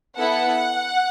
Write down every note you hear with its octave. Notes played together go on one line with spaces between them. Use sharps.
B3 E4 A4 F#5